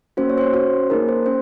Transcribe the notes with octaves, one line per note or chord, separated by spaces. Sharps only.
A#3 C#4 F#4 C5
C#5
C5
C#5
C#4 F#4 C5
A#3 D#4 G#4 A#4
C5
C#4 C5